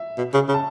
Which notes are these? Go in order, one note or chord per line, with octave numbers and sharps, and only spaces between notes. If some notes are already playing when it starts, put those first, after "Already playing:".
Already playing: E5
B2
C#3
C#3
A5